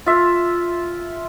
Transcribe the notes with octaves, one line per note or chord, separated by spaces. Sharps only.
F4 E5